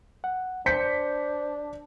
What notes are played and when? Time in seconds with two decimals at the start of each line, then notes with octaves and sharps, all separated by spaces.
0.24 F#5
0.66 D4 C5 G6 B6 C#7